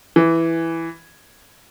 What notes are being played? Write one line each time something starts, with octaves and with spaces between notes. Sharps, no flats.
E3